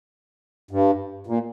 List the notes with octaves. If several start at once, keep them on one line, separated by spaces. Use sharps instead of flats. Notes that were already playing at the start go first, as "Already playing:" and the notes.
G2
A#2